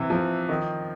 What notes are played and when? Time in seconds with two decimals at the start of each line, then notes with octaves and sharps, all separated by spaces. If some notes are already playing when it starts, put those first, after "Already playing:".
Already playing: C3 E3
0.10 F3
0.49 D#3